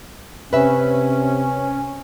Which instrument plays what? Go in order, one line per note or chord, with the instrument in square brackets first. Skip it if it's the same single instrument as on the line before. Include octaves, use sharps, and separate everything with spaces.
[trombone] C3 [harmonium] C#4 [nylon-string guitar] B4 E5